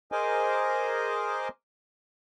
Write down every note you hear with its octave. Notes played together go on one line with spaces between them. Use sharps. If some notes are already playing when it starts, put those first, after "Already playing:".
G#4 A#4 C5 D#5 G#5 D6